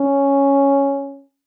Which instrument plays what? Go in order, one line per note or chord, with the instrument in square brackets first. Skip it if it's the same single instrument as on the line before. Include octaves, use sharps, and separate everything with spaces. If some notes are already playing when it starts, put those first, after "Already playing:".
Already playing: [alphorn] C#4